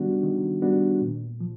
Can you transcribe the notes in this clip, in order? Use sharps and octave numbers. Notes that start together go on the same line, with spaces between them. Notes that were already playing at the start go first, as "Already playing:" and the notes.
Already playing: D#3 G3 B3 D4 F#4
D#3
G3 B3 D4 F#4
A#2
F3